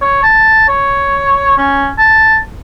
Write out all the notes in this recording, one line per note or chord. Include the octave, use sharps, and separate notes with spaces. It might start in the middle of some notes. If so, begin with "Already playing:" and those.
C#5
A5
C#5
C#4
A5